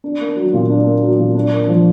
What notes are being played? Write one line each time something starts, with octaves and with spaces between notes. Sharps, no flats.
D4
A#3
F#3
A#2
D4
A#3
F#3
A#2
D4
A#3
F3